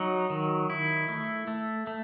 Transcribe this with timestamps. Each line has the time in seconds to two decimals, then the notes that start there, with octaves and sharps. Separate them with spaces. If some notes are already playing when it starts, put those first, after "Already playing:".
Already playing: F#3 D#4
0.30 D#3
0.70 E4
1.08 A3
1.48 A3
1.87 A3